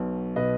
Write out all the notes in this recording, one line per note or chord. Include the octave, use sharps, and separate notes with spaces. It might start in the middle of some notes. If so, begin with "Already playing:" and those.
Already playing: B1 B2
B2 B4 D#5